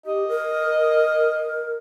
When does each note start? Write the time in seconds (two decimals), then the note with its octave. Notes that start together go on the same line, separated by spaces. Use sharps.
0.06 G4 D#5
0.28 A#4